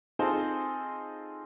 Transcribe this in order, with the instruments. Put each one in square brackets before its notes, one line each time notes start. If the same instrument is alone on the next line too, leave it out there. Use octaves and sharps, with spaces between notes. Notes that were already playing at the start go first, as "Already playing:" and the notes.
[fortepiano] C4 D#4 F4 G#4 A4 C5